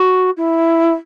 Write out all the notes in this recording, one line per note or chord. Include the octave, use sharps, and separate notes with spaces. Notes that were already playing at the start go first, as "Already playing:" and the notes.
Already playing: F#4
E4